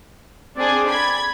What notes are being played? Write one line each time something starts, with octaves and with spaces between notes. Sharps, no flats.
C4 D4 G#4 D5
B5 G#6